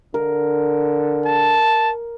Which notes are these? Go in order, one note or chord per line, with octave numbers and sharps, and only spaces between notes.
D3 A#4
A5